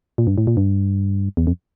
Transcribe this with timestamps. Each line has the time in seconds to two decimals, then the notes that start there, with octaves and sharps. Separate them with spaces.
0.18 A#2
0.27 G2
0.38 A2
0.47 A#2
0.57 G2
1.37 E2
1.47 F2